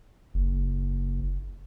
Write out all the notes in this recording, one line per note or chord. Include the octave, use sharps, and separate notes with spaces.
F#1